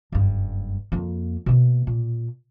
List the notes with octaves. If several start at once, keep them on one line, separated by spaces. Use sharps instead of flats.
F#1 G2
F2 A#3
B2 A#3
A#2